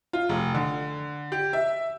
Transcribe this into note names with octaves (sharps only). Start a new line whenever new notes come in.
F4
F1
D3
G4
E5